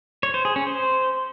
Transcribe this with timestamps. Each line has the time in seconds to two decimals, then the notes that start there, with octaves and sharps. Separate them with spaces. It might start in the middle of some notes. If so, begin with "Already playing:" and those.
0.23 C#5
0.34 C5
0.45 G#4
0.56 C#4
0.67 C5